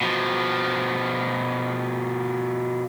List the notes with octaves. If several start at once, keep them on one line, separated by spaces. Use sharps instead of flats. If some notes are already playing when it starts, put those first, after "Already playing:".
B2 F3